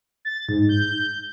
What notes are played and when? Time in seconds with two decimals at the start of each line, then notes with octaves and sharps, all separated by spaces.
0.25 A6
0.49 G#2
0.69 G6